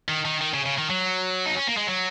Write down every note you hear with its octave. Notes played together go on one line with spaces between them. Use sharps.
D#3
D#3
D#3
C#3
C#3
D#3
F#3
D#4
C#4
A#3
G#3
F#3